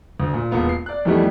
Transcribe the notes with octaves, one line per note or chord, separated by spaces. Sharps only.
D2
A#2
E1 A#3 B3 F4
C7
D5 F#6
F2 D#3 E3 G3 A3 B3